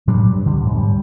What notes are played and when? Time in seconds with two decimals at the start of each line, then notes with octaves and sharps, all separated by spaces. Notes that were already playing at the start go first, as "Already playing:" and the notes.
0.07 A2 F#3 G3 D4
0.26 G2
0.46 D2 D3
0.61 D2 G#2
0.76 G3